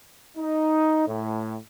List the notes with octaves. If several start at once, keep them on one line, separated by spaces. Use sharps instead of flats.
D#4
A2